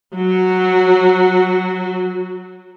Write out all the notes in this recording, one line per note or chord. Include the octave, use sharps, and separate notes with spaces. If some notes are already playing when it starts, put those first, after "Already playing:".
F#3 F#4